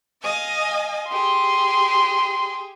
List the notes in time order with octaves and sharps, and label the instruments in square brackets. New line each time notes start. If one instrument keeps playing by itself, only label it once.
[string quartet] D#5 F5 G#5
[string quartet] G4 G#4 [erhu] C6